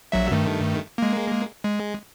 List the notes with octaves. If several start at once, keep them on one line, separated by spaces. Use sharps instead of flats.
A#1 F#3 E5
G2 D#3 A3
G#3 A#3
G#3